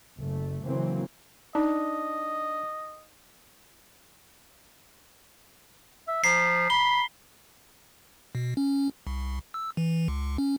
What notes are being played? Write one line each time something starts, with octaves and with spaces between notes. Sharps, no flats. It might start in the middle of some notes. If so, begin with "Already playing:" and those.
F#1 A3
C#3 E3 F#3 A#3 C4
D4 D#4 D#5
E5
F3 A#5 B6 C7
B5 G7
B2
C#4
C2
E6
E3
C#2
C#4